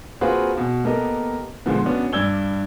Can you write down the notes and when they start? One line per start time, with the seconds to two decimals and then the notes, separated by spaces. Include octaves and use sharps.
0.21 A#3 C4 F4 F#4 G#4 B4
0.57 B2
0.84 A#3 B3 G4 A4 A#4 D#5
1.66 A#2 D3 F3 G#3 B3
1.85 B3 C#4 D4 F#4
2.13 G2 G3 D5 E6 G#6 G7